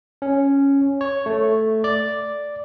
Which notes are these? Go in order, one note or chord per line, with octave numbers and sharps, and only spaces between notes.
C#4
C#5
A3
D5